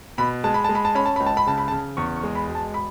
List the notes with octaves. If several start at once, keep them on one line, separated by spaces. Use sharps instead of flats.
B2 B5
G#3 A5
B5
G#3 A5
B5
A5
C#4 B5
A5
C#2 B5
A5
B5
C#3 A5
B5
C#3 A5
E2 C#6
C#6
G#3
B5
E1
A5
B5